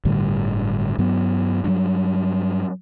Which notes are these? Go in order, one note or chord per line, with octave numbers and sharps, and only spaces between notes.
G1 A2 D3 G3
G2 F#3 B3
G2 F#3